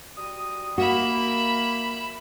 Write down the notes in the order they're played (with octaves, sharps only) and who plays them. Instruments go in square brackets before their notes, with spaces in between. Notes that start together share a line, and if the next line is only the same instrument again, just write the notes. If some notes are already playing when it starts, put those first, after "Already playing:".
[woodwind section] G3 F#4 D#6
[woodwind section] A#3 [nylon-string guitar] F#4 [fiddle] E5 B5